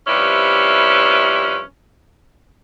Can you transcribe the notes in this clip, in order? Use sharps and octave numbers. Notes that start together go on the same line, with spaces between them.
C3 F3 G3 C#4 E4 B4